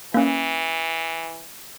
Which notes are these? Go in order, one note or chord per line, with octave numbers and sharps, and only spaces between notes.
E3 A#3 C#4